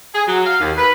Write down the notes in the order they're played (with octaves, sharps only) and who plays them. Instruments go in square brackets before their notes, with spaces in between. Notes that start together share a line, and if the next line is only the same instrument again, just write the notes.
[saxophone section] G#4
F#3
F5
D#2
B4